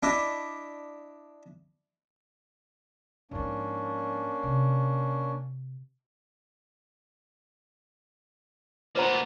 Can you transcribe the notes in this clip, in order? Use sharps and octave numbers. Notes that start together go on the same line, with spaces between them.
D4 E4 D#5
G#2 F3 A#3 C#4 D4
C3
A#2 B3 B4 C5 A#5